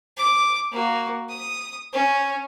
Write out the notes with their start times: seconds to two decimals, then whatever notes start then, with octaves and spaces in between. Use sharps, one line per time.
0.17 D6
0.71 A#3 F#4
1.29 D#6
1.93 C#4